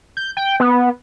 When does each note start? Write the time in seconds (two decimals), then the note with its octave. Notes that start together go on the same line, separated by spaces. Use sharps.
0.17 G6
0.37 G5
0.60 B3